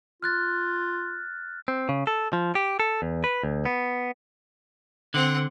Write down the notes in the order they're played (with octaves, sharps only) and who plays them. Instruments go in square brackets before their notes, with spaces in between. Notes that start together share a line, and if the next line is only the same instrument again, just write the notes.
[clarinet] F4 [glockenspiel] F6 F#6 A6
[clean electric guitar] C4
C#3
A4
F3
G4
A4
E2
B4
D2
B3
[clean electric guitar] D3 [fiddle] C4 F#5